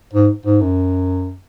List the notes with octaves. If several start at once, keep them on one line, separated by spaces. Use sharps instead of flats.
G#2
G#2
F#2